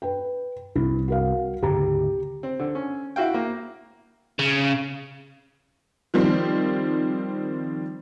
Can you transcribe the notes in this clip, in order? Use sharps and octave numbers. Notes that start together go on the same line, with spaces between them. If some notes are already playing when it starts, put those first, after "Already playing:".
B4 G5
C2 E4
F#4 A#4 F5
D2 G#2 C#3 G4 A#5
C4
D3
C#4
E4 F#4 F5 G5
A#3
C#3
D#3 F3 G3 C4